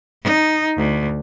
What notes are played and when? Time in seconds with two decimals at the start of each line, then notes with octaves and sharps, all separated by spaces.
0.23 D#4
0.77 D2